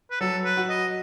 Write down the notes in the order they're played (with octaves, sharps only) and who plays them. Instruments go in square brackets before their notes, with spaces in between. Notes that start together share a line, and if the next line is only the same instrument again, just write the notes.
[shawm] B4
[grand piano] F#3 [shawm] A4
[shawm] B4
[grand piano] F#4
[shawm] D#5